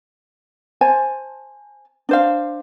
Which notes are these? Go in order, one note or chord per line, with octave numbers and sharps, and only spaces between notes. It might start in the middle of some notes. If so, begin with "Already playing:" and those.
C5 G#5 A5
D4 C5 F5